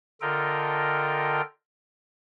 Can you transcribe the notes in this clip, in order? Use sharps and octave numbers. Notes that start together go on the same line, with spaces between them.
D3 F4 A4 A#4 D#5 G5